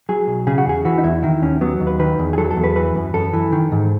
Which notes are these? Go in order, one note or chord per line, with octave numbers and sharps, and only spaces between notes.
F#3 G#4
B1
C#3 G#4
F#4
E2 G#4
E3 F#4
D#4
E2 E4
D#3 E4
D#2 C#4
F#3 B3
D#2
B4
D#3 B4
E2
G#4
F#3 A4
A4
E2
B4
E3 B4
F#2
F#2 A4
E3
D#3
G#2